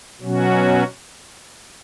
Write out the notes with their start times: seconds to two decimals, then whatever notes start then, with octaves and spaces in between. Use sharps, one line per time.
0.21 B2 F#3 C#4 F#4